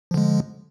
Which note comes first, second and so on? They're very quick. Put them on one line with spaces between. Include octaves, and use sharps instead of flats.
F3 D3 G#3